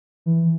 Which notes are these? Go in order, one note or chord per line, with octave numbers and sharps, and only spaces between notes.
E3